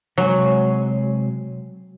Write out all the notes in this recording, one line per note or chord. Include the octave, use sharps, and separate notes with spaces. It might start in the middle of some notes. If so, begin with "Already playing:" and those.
C3 F#3 G#3 G#5